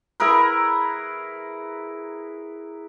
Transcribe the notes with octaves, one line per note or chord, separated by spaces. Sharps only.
E4 G#4 A#4 B4